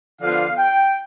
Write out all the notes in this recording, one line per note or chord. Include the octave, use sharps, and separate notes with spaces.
D3 F3 B3 D4 F4 F5
G5